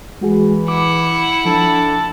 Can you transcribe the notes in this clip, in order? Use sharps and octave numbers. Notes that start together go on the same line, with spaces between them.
E3 G#3 F#4 G#4
E4 F#5 D6
F3 D4 A4